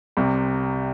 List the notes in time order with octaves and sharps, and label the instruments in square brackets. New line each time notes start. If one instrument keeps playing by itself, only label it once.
[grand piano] C2 C3